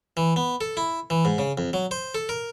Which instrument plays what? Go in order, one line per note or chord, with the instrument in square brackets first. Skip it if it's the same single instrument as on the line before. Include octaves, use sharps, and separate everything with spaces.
[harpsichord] E3
B3
A4
E4
E3
G#2
C#3
F2
F#3
C5
A4
A#4